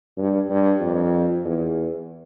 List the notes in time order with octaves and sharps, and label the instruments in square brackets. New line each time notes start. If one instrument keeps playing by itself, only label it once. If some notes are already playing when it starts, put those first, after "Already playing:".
[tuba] G2
G2
F2
E2